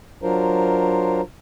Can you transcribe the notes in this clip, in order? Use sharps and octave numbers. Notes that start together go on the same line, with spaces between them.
F#3 D4 F4 A#4 C5